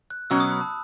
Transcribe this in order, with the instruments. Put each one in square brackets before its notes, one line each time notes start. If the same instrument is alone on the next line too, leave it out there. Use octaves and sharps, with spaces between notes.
[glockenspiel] F#6
[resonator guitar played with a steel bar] B2 F#3 C#4 [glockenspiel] E6
[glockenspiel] D#6
B5
A5